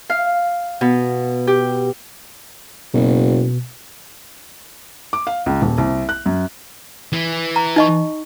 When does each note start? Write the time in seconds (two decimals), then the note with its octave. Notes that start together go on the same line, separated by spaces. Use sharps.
0.10 F5
0.81 B2
1.47 G4
2.94 F#1 B2
5.13 D6
5.27 F5
5.46 C#2
5.62 D#1
5.78 C2
6.09 F#6
6.26 F#2
7.13 E3
7.56 A#5
7.76 D#4 D#5 C#6